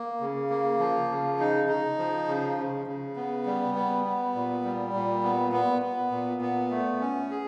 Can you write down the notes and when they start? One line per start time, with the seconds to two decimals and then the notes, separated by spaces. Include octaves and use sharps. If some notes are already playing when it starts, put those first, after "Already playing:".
Already playing: A#3
0.21 C#3
0.50 A#3
0.79 F3
1.09 C#3
1.39 D#4
1.68 D#4
1.98 F3
2.28 C#3
2.57 C#3
2.87 C#3
3.16 B3
3.46 G3
3.75 B3
4.05 B3
4.34 A#2
4.64 G3
4.94 A#2
5.23 B3
5.52 B3
5.82 B3
6.11 A#2
6.41 B3
6.71 A3
7.00 C#4
7.30 G#4